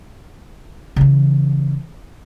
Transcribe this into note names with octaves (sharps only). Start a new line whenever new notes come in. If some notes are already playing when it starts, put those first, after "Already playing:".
C#3 E3